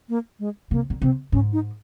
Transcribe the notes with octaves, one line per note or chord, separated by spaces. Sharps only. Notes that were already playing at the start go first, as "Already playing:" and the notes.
A#3
G#3
C3 A#3
A#2
C3 C4
G#2 C#4
D#4